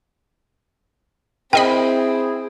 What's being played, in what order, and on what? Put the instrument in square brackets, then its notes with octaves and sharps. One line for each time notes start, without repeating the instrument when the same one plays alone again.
[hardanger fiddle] C4 [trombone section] E4 G#4 [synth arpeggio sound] A#4 D#5 B5 [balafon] G5